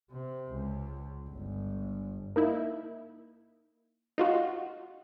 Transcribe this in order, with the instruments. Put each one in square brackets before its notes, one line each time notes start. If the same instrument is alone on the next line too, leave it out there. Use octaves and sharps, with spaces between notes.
[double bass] C3
C#2
G1
[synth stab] A#3 D#4 E4
D#4 F4 F#4